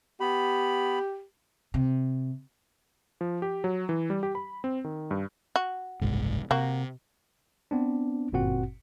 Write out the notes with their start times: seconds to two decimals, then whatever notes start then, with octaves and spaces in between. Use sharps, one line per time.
0.20 B3 G4 B5
1.74 C3
3.21 F3
3.42 G4
3.64 F#3
3.89 E3
4.10 G3
4.23 G4
4.35 B5
4.64 C4
4.84 D#3
5.11 G2
5.56 F#4
6.01 F#1 C2 G#2
6.51 C3 A#3 F#4
7.71 B3 C4 D4
8.32 G1 F#2 A#2 C4 F#4 F#5